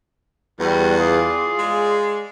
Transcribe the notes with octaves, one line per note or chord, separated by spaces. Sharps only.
E2 G3 F#4
F4 G#4 D5
G#3